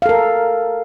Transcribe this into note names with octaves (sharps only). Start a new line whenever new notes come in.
A4 A#4 F5